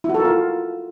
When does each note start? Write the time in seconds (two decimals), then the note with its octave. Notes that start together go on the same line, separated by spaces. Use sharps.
0.04 E4
0.09 F#4
0.14 A4
0.19 A#4
0.25 F4